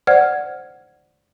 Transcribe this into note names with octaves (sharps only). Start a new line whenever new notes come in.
C5 D5 F#5 F6 G#6